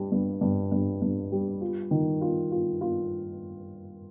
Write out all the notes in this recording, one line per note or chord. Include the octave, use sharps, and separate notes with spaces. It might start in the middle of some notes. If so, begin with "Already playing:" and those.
Already playing: G2 G3
G2
G2
G2
G2
G3
F4
D#3
F4
F4
F4